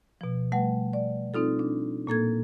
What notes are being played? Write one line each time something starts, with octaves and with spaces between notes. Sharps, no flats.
B2 F3
G3 A3 B4 F#5
D5
C4 D#4 F4 A4
D4
A#2 A#3 A4 G#6